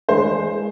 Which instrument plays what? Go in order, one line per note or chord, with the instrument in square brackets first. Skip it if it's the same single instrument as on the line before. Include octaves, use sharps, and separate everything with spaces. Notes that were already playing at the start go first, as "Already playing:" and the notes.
[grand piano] E3 G#3 D4 G#4 [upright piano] C5